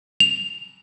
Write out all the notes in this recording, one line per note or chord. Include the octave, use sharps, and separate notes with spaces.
F7